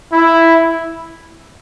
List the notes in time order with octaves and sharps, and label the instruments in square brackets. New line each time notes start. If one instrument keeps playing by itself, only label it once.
[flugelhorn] E4